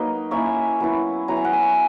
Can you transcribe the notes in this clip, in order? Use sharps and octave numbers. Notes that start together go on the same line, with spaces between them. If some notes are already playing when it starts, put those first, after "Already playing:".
Already playing: F#3 A#3 D#4 B4 D#5
A#3 C#4 E4 C#5 E5
F#3 B3 E4
F#3 B3 E4 A#5
G#5
F#5
E5 G#5